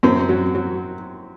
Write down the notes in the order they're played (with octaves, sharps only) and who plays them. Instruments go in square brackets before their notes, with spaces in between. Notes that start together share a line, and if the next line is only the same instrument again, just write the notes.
[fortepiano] F#2 C4
F#3
F#3